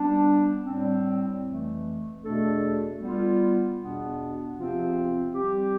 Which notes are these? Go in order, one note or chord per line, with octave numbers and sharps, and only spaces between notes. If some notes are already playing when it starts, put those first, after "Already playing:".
Already playing: G3 B3 D4
A2 G3 C4
F2 E3 A3
E2 B2 A3 D4 A4
G3 B3 F4
E2 B2 B3 D4
E2 C3 F3 C4 F4
G3 C4 G4